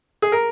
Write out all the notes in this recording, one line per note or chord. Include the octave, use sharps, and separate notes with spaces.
G#4
A#4